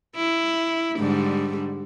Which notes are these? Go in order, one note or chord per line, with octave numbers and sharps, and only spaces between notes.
E4
G#2 D3 G3